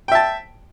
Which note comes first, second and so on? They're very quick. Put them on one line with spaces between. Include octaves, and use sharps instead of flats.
G5 E5 A5